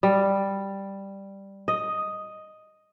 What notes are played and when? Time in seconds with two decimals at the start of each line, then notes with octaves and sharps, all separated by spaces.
0.03 G3
1.68 D#5